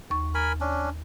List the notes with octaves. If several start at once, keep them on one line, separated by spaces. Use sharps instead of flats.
D#2 C#6
A#4 G#5 B5
C#4 D4